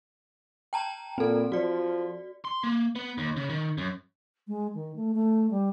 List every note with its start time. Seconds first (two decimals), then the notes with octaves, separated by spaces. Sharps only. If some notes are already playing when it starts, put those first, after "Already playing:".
0.73 G5 A5 A#5
1.18 A#2 C4 A4
1.52 F3 F#4 D5
2.45 C6
2.64 A#3
2.96 B3
3.18 D#2
3.36 C#3
3.50 D#3
3.78 F#2
4.48 G#3
4.74 D#3
4.96 A3
5.14 A3
5.51 G3